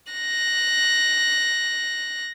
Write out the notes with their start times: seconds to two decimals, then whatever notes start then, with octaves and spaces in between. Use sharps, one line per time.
0.12 F#6 A#6